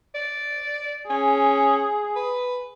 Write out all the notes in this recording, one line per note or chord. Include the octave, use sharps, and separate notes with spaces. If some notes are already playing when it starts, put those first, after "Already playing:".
D5
C#4 G#4
B4